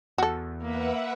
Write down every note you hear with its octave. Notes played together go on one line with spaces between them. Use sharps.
E2 F#4 A4
A#3 B4 E5 F#5